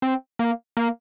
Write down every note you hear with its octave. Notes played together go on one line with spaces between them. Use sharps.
C4
A#3
A#3